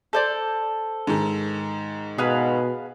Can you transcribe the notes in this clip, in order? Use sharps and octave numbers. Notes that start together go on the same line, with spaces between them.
A4 C5 D5
G#2 D#3
B2 G#4 B4 F5